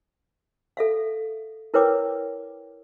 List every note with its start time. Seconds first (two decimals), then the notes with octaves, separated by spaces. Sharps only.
0.77 A4 E5 F5
1.74 E4 A#4 B4 C#5 G5 D6